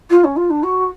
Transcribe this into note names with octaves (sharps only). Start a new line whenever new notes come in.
F4
C#4
F4
D4
F#4